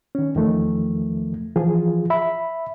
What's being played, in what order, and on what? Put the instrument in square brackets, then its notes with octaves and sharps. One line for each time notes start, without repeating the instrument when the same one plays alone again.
[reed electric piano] D#3 C#4
E2 D#3 F3 A3
E3 F3 F4 G#4
E5 B5